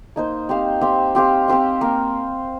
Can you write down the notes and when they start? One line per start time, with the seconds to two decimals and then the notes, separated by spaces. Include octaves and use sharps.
0.16 A#3 D#4 C5
0.49 C4 G4 C5 F5
0.81 C4 G4 C5 F5
1.15 C4 G4 C5 F5
1.48 C4 G4 C5 F5
1.81 A#3